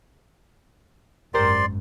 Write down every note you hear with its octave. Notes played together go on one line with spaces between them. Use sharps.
G#1 F#2 G4 A#4 C5 D5 C6